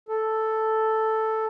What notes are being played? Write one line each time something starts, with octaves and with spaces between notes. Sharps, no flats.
A4